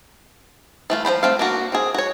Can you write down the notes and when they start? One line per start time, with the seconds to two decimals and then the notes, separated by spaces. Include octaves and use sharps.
0.90 E3 A3 F4
1.05 F3 C4 C5 B5
1.23 A3 C4 F5
1.39 A#3 B3 D4 F#4
1.72 C4 G#4
1.94 F#4 C#5